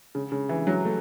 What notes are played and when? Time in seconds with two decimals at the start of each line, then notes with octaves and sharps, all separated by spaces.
0.15 C#3
0.32 C#3
0.49 E3
0.67 F#3
0.85 A3